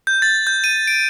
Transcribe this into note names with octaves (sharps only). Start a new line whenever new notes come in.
G6
A6
G6
D#7
D7